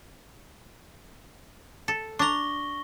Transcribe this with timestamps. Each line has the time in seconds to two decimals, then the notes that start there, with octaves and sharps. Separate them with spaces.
1.88 A4
2.19 D4 A#5 C#6 A#6 G7